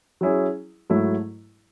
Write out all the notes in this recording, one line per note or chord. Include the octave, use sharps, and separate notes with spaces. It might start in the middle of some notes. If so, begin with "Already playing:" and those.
F#3 C#4 E4 G#4
G#2 F#3 A3 E4